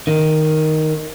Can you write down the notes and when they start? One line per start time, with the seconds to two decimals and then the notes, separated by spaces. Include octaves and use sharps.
0.07 D#3